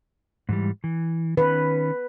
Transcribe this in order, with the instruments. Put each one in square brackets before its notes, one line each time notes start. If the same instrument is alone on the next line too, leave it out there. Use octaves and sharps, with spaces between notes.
[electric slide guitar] G#2 E3 G3
E3
[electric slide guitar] D#3 C#4 [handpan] B4